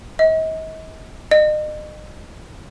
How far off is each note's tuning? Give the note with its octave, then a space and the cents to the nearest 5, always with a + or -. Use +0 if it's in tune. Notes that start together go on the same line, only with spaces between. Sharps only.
D#5 +40
D#5 -35